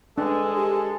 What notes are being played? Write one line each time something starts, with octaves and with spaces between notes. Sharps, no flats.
G#3 D4 A4 B4
G4